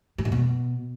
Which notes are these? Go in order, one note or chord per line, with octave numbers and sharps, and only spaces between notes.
G2
A2
B2